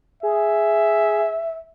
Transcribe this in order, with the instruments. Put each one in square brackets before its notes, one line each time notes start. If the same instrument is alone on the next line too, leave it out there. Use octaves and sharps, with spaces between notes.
[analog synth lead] G#4 [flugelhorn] E5